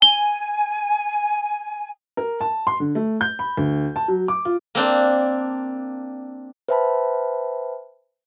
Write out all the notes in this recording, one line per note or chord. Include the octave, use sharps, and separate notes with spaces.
G#5 G7
A#4
A5
C6
D3
A3
G6
B5
D2
A5
F#3
D6
F4
A#3 C4 D4
B4 C5 E5 G5 A5 B5